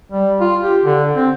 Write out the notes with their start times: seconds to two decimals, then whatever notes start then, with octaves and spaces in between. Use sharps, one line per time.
0.12 G3
0.40 F4
0.63 G4
0.85 D3
1.15 C4